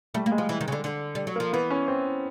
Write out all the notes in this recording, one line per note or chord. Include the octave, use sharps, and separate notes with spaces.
G3 A3
A#3
G#3
F3
E3
D#3
C#3
D3
D3
G3
F#3
F3 A#3
E3 B3
C#4
C4